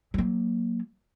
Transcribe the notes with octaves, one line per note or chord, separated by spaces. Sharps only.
F#3 A#3